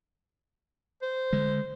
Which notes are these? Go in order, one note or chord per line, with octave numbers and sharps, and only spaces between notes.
C5
D3 G#3